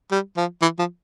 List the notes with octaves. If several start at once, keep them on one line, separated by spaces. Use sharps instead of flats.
G3
F3
E3
F3